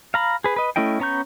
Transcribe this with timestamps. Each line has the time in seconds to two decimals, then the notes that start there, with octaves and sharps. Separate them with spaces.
0.14 F5 A#5 B5
0.44 G#4 B4
0.56 B4 D#5
0.76 A3 C#4 E4 D#5 G5
1.00 B3 C#4 A#5 C#6 G6